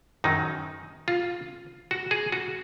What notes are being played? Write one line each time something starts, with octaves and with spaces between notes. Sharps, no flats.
F#2 D#3 F#3 D#4
F4
F#4
G#4
F#4